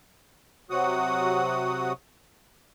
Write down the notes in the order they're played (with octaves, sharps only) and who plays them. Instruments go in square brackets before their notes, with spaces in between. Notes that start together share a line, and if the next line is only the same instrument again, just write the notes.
[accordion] C3 F#3 F#4 F#5 D#6